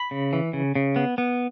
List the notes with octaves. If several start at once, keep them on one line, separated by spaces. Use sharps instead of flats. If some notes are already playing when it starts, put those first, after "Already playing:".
Already playing: B5
C#3
E3
C#3
C#3
B3
B3